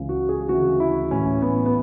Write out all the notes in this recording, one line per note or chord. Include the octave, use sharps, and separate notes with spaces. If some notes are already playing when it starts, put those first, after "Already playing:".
Already playing: C#2 C#3 E3
F#4
G#4
D2 C#3 E3 F#4
E4
A1 A2 E3 C#4
B3
B3